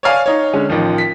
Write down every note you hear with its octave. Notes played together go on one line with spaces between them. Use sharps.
C#5 D5 F5 G#5
D#4 C#5
D3 G#3 C#4
A1 D#3 F3
B6